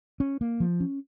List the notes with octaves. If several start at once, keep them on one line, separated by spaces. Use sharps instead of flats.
C#4
A#3
F3
C#4